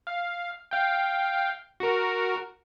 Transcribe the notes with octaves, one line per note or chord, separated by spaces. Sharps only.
F5
F5 G5
F#4 A#4